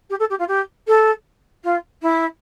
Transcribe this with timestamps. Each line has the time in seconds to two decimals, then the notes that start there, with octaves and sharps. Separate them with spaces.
0.09 G4
0.19 A4
0.30 G4
0.38 F4
0.48 G4
0.87 A4
1.63 F4
2.02 E4